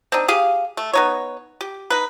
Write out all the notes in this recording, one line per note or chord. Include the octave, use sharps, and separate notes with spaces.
C4 D4 D#4
G4 G#4 F5
A3
B3 D#4 C#5
G4
D#4 B4